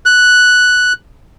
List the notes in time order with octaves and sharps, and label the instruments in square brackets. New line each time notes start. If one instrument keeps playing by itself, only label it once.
[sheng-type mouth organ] F#6